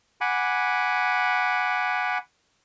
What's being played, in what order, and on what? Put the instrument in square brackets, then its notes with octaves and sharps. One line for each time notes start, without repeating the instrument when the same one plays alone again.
[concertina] F#5 G#5 B5 D6